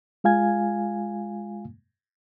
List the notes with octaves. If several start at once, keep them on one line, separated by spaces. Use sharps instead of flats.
G#3 F4 F5 G#5 G#6